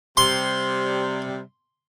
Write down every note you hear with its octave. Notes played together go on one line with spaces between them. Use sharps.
C3 G3 C6